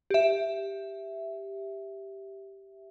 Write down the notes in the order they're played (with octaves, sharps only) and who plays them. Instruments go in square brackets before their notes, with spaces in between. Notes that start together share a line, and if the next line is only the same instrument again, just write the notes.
[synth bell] G4 E5